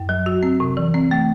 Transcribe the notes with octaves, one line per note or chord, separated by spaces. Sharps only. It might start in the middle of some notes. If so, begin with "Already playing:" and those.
Already playing: F#2
F#3
F#4
C4
C3
E3
C4
A3